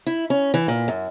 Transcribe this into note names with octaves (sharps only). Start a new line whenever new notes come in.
E4
C#4
E3
A#2
F#2